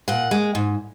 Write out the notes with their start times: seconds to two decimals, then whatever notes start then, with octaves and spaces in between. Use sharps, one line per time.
0.08 A#2 F#5
0.31 G#3
0.55 G#2